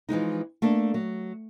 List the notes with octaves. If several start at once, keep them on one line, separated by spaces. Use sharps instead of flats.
E3 F3 G#3 D#4
A3 A#3 D4 A4
F#3